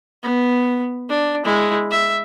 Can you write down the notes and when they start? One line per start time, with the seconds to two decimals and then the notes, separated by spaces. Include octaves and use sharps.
0.23 B3
1.09 D4
1.45 G#3 E4
1.91 E5